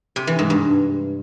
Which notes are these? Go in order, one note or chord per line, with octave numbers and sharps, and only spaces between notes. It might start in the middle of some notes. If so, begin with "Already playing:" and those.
C3
E3
G#2
G2